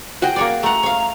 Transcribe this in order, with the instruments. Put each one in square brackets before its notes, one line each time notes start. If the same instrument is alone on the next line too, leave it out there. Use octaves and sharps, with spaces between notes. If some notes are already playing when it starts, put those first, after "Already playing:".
[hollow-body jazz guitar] F#4 G#4 G5
[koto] A#3 C#5 D5
[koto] A3 F#5 [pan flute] A#5
[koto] C#5 F5